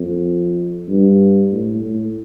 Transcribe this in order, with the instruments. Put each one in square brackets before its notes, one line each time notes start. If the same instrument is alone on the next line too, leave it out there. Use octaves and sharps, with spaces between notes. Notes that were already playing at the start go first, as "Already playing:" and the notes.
Already playing: [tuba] F2
G2
A2
A2